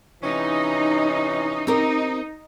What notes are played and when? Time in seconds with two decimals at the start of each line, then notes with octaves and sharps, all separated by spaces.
0.23 C3 E3 C#4 D#4
1.67 C4 D#4 G4 A#4